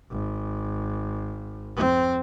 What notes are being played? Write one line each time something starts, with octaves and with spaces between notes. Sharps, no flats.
G#1
F2 C4